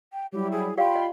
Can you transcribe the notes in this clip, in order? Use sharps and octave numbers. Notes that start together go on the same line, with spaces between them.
G5
F#3 G3 E4 G4
G#4
F4 G4 D5 F5 G5 B5 C6
D#5